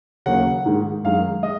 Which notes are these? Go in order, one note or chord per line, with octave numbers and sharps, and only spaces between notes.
D#2 C#3 F#3 A#3 F#5
G#2 D#3 G#3
F#2 D#3 G#3 F5
G#3 D#5